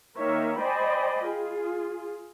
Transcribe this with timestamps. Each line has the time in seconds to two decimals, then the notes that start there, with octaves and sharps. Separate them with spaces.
0.18 D#3 A#3 D#4 A#4 C#5 E5
0.60 C5 D5 D#5 G5 G#5 B5
1.25 F4 G#4